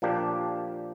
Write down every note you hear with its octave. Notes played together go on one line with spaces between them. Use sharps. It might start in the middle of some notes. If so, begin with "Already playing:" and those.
A#2 F3 A#3 D4 G4